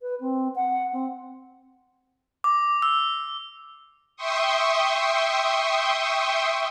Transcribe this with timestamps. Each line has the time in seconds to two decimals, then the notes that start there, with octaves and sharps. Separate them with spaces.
0.02 B4
0.20 C4
0.56 F#5
0.93 C4
2.44 D6
2.82 E6
4.16 E5 G5 C6 C#6 D#6